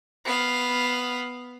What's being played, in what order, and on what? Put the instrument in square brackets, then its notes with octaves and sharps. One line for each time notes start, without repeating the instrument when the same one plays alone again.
[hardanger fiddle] B3 F5